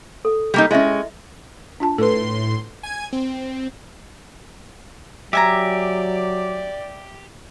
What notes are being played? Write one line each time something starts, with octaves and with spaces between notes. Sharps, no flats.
A4
G3 A#3 D#4
G#3 C#4 E4 D#5 E5
D4 F4 A5
A2 A4 B4 C6
G#5 G#6
C4
F#3 G4 D5 E5 G#5 A#5